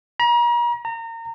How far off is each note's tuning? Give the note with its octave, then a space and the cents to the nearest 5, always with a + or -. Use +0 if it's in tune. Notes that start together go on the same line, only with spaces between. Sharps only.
A#5 +40
A#5 -30